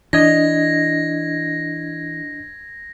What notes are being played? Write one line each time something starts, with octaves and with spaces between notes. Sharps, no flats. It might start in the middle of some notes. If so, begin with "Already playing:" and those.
E3 D4 D#5 G#6 A#6